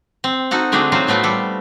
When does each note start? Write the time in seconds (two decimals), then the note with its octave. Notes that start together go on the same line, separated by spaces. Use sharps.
0.24 C4
0.51 D#4 F#4 A4 F#5
0.72 D3 G#3 A3 C4 D4 F#4
0.92 F#3 C4 D#4 F4 F#4 C5
1.07 A2 A3 B3 C4 A4
1.23 G3 A4